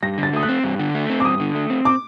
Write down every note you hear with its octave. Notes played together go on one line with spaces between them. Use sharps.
G2 A#6
D3
A6
A3 D#6
F#6
C4
G2
D3
A3
C4
D6
G2 D#6
D3
A3
C4
D6